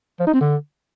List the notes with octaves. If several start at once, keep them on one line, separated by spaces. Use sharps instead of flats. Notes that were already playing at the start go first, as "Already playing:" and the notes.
F3
D#4
C4
D3